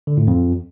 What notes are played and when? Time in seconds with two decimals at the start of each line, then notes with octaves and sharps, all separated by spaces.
0.07 D3
0.17 A2
0.27 F2